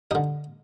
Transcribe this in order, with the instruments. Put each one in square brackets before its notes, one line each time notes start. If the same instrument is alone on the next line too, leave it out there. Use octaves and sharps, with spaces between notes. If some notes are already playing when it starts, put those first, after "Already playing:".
[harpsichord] D3 G3 D#4